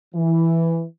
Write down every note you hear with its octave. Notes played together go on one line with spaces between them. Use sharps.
E3